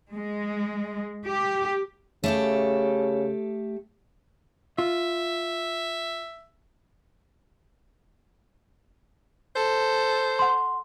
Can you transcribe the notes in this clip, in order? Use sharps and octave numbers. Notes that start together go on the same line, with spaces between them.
G#3
G4
C#3 A3 G4 A4
F4 E5
A4 C5
F#5 C6